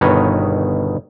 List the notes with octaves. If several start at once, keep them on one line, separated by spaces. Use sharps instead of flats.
G1 B2 D#3 B4 C#5 D#5